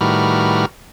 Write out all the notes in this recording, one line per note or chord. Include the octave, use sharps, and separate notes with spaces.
A2 D#3 G3 F#4 B4 F6